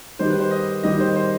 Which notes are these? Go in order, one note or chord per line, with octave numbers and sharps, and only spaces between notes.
D#3 G3 D#4 G4 C5
B4
C5
D#5
D#3 G3 D#4 G4 D#5
C5
C5